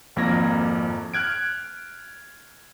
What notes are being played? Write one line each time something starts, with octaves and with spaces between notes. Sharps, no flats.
G#1 F2 A#3 A#4 G#6 A#6
F6 F#6 G#6 D7